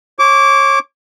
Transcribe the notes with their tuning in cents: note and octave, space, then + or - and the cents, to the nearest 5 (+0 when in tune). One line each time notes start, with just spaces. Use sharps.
C#5 -30 D6 -20